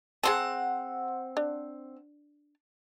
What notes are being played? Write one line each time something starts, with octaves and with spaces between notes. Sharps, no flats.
C4 G#4 C5 F#5 A5
D4